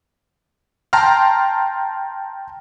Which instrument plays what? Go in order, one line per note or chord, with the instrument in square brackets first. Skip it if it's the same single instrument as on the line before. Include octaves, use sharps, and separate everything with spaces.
[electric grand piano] G5 A5 A#5 C6 F6